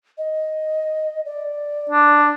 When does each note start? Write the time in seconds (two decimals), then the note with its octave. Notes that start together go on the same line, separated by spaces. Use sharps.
0.18 D#5
1.25 D5
1.89 D4